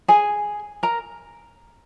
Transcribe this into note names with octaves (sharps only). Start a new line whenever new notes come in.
G#4 G#5
A#4 A#5